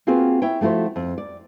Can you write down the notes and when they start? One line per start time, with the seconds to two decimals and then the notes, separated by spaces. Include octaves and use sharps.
0.07 A#3 C4 F4 F#4 G#4 B4
0.42 E4 C#5 G5
0.61 F3 A3 E4 F#4 C5
0.96 F2
1.18 D5